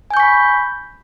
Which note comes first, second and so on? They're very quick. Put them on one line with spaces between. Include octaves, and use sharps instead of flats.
G#5 G6 C#6 B6 B5